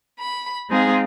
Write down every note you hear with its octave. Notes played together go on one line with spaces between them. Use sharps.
B5
G#3 C4 D#4 F4 G#4